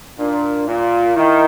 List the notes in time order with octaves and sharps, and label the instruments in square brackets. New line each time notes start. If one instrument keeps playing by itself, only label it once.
[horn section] A#2 [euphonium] D4
[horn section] A#2 [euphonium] F4
[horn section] D#3 [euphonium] E4